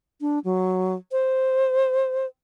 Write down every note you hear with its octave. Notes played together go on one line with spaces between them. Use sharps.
D4
F#3
C5